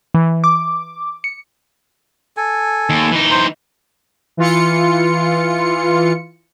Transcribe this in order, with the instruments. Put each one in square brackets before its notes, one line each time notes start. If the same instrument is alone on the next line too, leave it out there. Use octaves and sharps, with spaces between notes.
[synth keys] E3
D6
C#7
[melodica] A4 G#5
[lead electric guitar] D#2
E3 D#4
[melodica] C5 A#5 C6
[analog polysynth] E3 F4 C#7